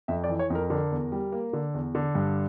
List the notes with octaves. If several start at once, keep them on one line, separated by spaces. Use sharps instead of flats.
F2 E5
D5
E3
C#5
F2
A#4
D3 A#4
E2
G3
A#3
D3
E2
D3
G2